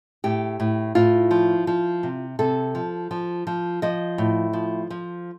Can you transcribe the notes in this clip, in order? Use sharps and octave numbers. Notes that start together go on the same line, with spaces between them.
A2 G4
A2
A2 F4
F3
F3
C3
C3 A4
F3
F3
F3
F3 D#5
A2
F3
F3